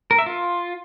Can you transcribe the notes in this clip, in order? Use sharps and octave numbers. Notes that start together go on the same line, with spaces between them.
A#4
E5
F4